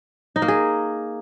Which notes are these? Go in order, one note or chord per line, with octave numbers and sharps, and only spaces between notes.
D#4
A#3
G#4